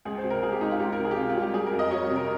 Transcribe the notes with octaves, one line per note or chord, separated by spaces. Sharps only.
C#2 G#4
C5
C3
A#4
C#2 G#4
G4
C#2 D#4
F4
C#2 G4
A#4
C3
G#4
G4
C3 F4
F4
G3
G4
G3 G#4
A#4
F2
D#5
G3 C#5
C3
A#4